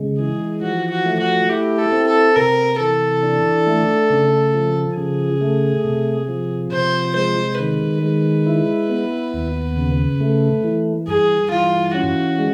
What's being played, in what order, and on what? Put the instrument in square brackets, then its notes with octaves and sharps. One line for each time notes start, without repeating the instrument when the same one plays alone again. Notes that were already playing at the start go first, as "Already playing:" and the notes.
Already playing: [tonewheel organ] C#3 G#3
[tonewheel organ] E3 [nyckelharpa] G#4
[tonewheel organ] F3 [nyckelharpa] F#4
[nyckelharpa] F#4
[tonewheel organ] A3
[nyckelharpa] F#4
[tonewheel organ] E4 [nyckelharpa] G4
[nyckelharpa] A4
[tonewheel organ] C4
[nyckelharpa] A4
[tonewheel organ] C3 [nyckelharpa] A#4
[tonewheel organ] E3 [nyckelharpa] A4
[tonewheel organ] D4
A3
C#3
F3
[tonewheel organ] C#3 [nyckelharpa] G#4
[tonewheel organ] A3
C3
F3
[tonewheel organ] C3 [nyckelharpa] C5
[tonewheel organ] G#3 [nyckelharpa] C5
[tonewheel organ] D#3 [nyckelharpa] B4
[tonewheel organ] G#3
E4
B3
D#2
C#3
A3
E3
[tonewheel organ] G2 [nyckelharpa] G#4
[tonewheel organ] E3 [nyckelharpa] F4
[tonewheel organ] C#4 [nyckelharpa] F#4
[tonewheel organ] G#3